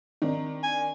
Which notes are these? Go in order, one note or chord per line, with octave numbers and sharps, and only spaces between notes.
D#3 C4 D4 D#4
G#5